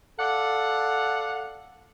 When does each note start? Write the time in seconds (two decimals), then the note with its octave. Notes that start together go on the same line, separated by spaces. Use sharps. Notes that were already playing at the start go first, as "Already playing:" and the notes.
0.20 A4 D5 F5 F#5